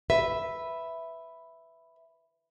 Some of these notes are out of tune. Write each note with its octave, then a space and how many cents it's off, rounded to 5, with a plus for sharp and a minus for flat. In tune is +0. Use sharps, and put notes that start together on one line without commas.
B4 +0 E5 +0